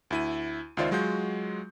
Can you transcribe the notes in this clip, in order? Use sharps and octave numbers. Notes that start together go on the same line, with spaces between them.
D2 E4 D#7
C#2 D#3 F4 C5 D5 E5
F#3 G#3 F4 F#4 G6